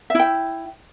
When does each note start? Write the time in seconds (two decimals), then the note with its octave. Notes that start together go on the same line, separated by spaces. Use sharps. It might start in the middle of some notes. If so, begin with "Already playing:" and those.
0.10 E5
0.15 E4
0.19 G5